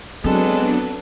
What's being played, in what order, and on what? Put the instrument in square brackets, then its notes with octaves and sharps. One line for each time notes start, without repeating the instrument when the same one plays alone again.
[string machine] F#3 B3 D4 [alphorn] G#3 [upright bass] C4 [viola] A4 B4